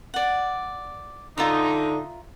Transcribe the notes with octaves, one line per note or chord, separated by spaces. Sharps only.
D5 F#5
D3 D#4 F4 E5 A#5